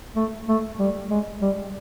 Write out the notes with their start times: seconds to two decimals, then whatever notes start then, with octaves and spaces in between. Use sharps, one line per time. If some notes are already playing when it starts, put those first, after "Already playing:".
0.16 A3
0.48 A3
0.79 G3
1.10 G#3
1.41 G3